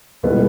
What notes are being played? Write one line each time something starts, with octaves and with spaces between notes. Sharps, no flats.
C#2 B2 G3 B3 E4